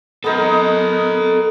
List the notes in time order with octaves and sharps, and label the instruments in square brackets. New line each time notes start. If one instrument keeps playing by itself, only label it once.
[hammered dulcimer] B3 D#4 A#4 [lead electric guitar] A4 D#5